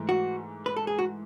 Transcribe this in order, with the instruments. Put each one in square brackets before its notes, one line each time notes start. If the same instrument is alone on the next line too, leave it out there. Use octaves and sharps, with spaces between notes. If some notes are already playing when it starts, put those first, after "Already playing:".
Already playing: [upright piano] G#2 E3 A3
[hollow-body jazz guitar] F#4
B4
A4
G#4
F#4